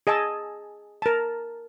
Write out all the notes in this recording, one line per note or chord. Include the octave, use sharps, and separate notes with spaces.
G#4 D#5 G#5 A5 E6
A#4 A5